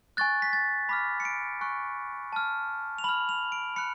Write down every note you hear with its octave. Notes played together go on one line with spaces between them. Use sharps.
G#5 C#6 F#6 A6
B6
A6
B5 D6 F6 B6
C#7
D7
G#5 C#6 F#6
A5 F6
F7
B5 F6 F#7
F7
D7
B5 F#6 C#7